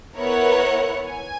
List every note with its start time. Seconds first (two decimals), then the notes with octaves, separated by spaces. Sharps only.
0.17 B3 E4 A#4 C#5 F#5
1.08 G#5